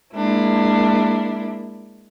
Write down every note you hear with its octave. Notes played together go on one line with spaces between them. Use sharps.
G#3 A#3 D4 E4